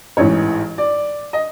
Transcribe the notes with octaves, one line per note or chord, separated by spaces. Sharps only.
A1 G#2 E3 C#5
D5
D#5